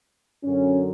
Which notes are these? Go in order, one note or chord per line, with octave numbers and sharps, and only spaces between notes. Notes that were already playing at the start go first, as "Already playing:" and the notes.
F#2 D3 F#3 C#4